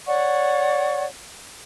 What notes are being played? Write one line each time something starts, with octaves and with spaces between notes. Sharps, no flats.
C#5 D5 F#5 C#6